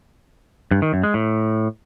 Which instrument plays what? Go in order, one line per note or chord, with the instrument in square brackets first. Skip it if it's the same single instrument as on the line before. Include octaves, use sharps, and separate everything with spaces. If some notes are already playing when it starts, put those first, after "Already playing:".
[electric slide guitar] G2
D#3
F#2
G#3
A2